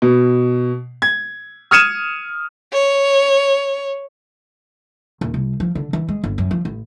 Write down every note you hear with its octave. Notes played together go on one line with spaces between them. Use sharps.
B2
G#6
D#6 F6 G#6 C#7 D#7 E7
C#5
D#1
C2
F3
D3
E3
G#3
G1
F#2
F3
A1